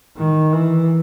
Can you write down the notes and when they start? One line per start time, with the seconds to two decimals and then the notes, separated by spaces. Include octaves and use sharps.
0.17 D#3
0.53 E3